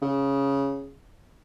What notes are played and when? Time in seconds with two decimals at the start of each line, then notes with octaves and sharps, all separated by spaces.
0.02 C#3